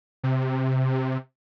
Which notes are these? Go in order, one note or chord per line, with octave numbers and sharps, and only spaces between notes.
C3